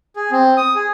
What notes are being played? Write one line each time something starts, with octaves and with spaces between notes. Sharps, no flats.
G#4
C4
D#6
G#4